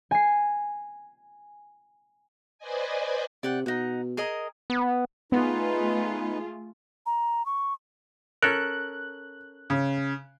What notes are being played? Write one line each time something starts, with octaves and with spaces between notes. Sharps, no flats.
G#5 C7
B4 C5 D5 D#5 G#5
C3 D5 F#5 G5
B2 D#4 F#5
G#4 A#4 D#5
B3
A3 B3 D#4 F4 G#4 B4
A#5
C#6
C#4 A4 A#4 F#6
C#3